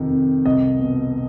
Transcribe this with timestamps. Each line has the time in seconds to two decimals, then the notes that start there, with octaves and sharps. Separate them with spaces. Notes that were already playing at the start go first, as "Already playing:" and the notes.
Already playing: F2 C3 D#3
0.10 F2
0.45 C2 D#5
0.80 B2